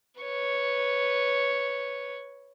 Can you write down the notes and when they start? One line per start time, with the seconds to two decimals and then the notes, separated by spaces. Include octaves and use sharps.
0.21 B4 C#5